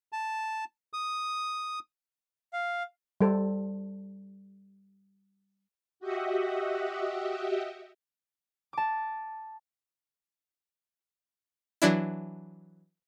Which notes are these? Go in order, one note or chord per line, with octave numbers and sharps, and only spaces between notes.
A5
D#6
F5
G3 A4 C5
F#4 G4 D#5 E5 F#5
A5 D6
E3 F#3 D4 E4